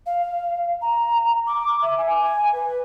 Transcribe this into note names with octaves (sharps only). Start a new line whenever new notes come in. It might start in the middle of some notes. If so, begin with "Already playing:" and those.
F5
A#5
D6
E5
G#5
G#5
B4